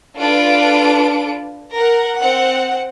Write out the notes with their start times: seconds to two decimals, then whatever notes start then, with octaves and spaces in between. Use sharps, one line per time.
0.17 D4 F4 A4 B4 D7
1.75 A#4 F#5
2.19 C4 F#5